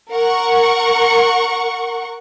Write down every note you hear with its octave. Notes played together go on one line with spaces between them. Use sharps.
A#4 F#5 C#6